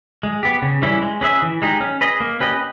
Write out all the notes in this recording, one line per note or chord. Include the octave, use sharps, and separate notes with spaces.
G#3
B3 G4
C#3
E3 G3 C#4 E4
G#3
C#4 G#4 B4 E5
E3
G#3 D#4 G4
C#4
G#4 B4 D#5
A#3
C#4 G4 B4 D#5